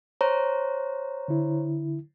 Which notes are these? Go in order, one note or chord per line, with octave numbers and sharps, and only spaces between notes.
C5 C#5 A#5
D3 E4